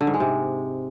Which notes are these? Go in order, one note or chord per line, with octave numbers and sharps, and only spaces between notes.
D3
G#2
G#3
C3